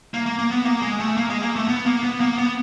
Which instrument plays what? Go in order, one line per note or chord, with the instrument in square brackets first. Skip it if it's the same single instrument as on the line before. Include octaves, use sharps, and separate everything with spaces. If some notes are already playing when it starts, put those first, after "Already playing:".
[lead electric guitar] A#3
A#3
A#3
B3
A#3
G#3
A3
A#3
G#3
A#3
A3
B3
A#3
B3
A#3
B3